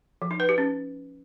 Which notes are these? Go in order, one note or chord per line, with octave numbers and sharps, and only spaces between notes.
F3
D#4
B4
G4
C#4